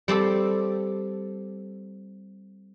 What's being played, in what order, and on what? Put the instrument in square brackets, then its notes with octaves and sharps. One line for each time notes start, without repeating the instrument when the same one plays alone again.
[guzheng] G3 C4 G4 A4